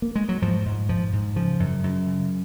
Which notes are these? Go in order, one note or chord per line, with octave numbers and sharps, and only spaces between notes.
A#3
G#3
F#3
G#2 F3
G#2
G#2 F3
G#2
C#3 F3
F#2
F#2
C#3